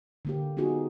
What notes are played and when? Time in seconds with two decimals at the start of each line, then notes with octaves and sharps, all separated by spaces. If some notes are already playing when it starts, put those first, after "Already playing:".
0.25 D3 A#3 G4
0.57 B3 D#4 F4 F#4 G#4